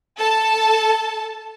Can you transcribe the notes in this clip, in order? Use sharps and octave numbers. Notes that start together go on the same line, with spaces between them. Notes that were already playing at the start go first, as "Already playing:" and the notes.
A4 A5